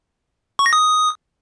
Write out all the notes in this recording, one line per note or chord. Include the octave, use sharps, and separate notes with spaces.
C#6
A#6
D#6